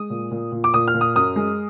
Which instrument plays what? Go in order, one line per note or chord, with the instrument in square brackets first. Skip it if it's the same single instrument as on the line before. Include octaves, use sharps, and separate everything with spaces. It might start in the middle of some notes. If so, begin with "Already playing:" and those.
Already playing: [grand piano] G#3 D#6
A#2
A#2
A#2
D6
A#2 D#6
F6
A#2
D#6
F#2 D#6
G#3